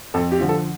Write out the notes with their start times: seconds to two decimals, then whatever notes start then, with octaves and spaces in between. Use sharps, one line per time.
0.14 F2 A4
0.32 G4
0.40 D3 F3
0.49 A4